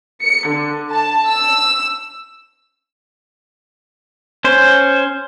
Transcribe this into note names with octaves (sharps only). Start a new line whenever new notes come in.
C#7
D3
A5
E6
C#4 C5